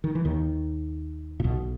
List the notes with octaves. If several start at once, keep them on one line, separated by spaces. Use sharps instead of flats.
D#3
E3
D#2 D#3
A#2
B1 B2